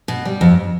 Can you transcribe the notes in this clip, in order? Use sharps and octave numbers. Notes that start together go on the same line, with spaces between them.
B2
G3
F2